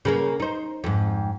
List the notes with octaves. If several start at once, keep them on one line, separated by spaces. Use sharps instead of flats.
C#3 A#3 A#4
D#4 C5
F2 G#2